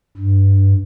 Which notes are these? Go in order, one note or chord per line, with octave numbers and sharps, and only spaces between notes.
G2